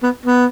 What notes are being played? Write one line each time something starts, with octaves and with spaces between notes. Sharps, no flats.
B3
B3